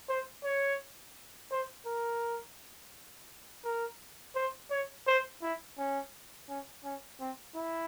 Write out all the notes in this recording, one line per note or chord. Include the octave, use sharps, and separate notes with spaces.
C5
C#5
C5
A#4
A#4
C5
C#5
C5
E4
C#4
C#4
C#4
C4
E4